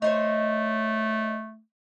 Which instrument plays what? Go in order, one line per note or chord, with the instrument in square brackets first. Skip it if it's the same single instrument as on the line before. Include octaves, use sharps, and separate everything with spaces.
[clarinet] A3 [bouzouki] D#4 C5 C#5